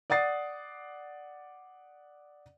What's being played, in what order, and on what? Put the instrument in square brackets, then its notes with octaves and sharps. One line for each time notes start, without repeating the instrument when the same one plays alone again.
[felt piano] D5 F#5 D#6 A6 C7